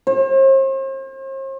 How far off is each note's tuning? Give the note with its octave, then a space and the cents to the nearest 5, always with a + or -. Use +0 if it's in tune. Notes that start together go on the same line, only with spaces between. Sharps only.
C5 +45